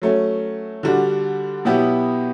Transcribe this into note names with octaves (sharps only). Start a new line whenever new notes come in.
F#3 A3 C#4
D3 G3 D4 F#4
B2 F#3 B3 E4 G4